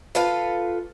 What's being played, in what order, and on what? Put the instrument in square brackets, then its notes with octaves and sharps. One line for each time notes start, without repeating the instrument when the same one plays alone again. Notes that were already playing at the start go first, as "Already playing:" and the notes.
[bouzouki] F4 A4 B4 F5